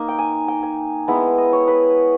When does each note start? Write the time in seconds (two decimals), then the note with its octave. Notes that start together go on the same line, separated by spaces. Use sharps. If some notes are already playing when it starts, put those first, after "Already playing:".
Already playing: A#3 D#4
0.09 G5
0.19 G#5
0.48 G5
0.63 G#5
1.08 G#3 B3 E4
1.38 D#5
1.53 C#5
1.68 B4